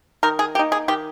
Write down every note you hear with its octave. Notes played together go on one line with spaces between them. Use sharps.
D#3 A#4
G#4
A#3 D#4 G4
G#4
D#3 G4